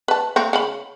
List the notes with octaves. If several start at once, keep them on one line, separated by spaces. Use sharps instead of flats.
B4 A5
A3 A#3 C4
C#3 B5